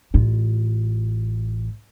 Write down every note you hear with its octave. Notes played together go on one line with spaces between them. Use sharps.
A1 F4